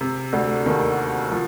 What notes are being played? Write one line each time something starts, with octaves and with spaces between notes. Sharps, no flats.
C3
D2 D3
D#2 D#3
F3